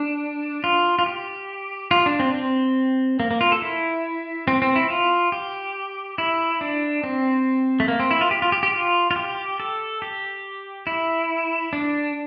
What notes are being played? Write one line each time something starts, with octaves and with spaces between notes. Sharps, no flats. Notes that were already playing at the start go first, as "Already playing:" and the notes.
Already playing: D4
F4
F4
G4
F4
D4
C4
C4
A#3
A#3
F4
A4
E4
C4
C4
E4
F4
G4
E4
D4
C4
A3
A#3
C4
E4
F4
G4
F4
G4
G4
F4
F4
G4
A4
G4
E4
D4